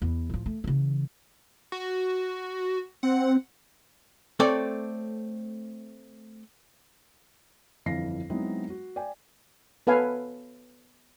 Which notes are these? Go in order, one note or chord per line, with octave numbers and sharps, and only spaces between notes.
E2
A2 F3
A3
C#3 E3
F#4
C4 F#5
A3 C4 A4 C#5 D5
G1 F2 E3 F5 A#6 C7
F#3 G#3 B3 C4 D#4 E4
F#4
D5 G5 G#5
B3 A4 B4 C#5 F5 G#5